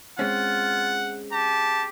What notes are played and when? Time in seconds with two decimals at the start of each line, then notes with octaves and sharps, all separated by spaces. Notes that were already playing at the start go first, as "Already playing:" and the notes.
0.19 G#3 C4 C#4 F4 F#5
1.33 G4 A5